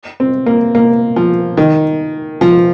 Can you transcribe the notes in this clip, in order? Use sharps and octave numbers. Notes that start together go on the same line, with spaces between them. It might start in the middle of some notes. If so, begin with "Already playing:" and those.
C4
A#3
A#3
F3
D#3
F3